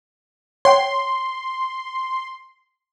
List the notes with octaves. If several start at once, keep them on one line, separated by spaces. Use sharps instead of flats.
C#5 F#5 G5 C6